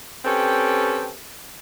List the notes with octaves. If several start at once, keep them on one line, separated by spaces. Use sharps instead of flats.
C4 C#4 G4 A4 B4